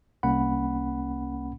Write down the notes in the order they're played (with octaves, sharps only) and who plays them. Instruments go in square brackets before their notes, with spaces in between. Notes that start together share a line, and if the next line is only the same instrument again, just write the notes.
[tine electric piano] C2 A#3 C#4 F#5 B5